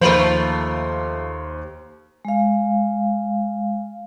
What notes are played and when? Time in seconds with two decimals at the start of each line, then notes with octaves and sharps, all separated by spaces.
0.01 D#2 F3 A3 F4 A#4 C5 B5 C6
2.25 G#3 F5